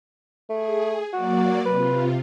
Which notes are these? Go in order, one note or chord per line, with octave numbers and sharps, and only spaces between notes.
A3 G#4
F#3 A#3 F#4 D5
C3 F4 B4